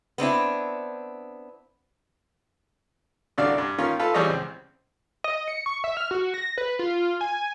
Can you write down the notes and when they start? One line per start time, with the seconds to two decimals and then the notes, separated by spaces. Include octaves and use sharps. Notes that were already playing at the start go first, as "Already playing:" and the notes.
0.18 B3 C4 D4 E4
3.38 C2 D3 D4 F#4 D5 F5
3.58 G2
3.78 D#3 A#3 C#4 F4
3.99 F4 A4 B4
4.14 E3 F3 G3 G#4 C#5 D#5
4.26 C#2 C4
5.24 D#5
5.48 C#7
5.66 C#6
5.84 E5
5.97 F6
6.11 F#4
6.34 A#6
6.58 B4
6.79 F4
7.21 G#5